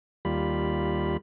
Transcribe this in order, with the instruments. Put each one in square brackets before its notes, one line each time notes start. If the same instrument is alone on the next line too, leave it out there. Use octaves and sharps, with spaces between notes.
[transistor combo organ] D#2 G3 F4 B5